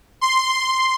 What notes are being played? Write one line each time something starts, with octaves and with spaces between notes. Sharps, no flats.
C6
C6